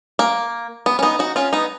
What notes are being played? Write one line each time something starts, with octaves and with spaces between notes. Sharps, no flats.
A#3
B3
C#4
B3 D#4
D#4 F#4
C#4 F4
B3 D#4